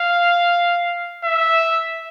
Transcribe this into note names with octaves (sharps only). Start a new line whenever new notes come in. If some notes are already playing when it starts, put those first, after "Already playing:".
Already playing: F5
E5